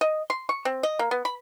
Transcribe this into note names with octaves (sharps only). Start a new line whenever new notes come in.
D#5
C6
C#6
C4
D#5
A#3
B3
B5